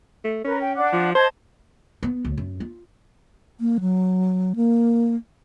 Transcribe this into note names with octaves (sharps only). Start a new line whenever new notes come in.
A3
C#4 A#4 B4
G5
D4 F#5 D6
F3
C5 D#5 A5 G#6
B3
D2
F#2
F4
A#3
F#3
A#3